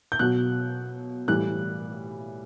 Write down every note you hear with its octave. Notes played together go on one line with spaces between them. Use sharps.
G6
B2 F#3 F#6
A2 E3 G3 F#6